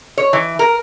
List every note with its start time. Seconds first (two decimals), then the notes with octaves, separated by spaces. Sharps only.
0.18 C#5
0.33 E3
0.59 A#4